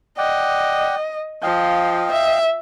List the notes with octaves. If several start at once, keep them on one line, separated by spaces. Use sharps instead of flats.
D5 D#5 F#5 G5
F3 D#5 F5 G5
E5